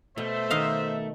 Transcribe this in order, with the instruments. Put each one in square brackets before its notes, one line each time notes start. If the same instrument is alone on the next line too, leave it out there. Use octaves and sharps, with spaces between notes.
[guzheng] B2 [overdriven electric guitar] A3 [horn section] C5 E5
[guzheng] D#3 D#5 F5